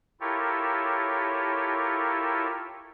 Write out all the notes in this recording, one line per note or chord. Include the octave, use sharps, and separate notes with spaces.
E4 F4 G4 A4 A#4 C#5